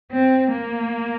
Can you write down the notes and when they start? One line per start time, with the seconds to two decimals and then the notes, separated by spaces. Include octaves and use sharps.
0.12 C4
0.51 A#3